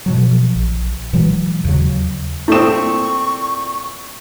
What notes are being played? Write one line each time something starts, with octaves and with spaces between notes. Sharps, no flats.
B2 F3 F#3
A#1
A#2 E3 F#3 G#3
D#2 C#3 F#3
A#2 A3 C4 E4 C#6 D#6 E7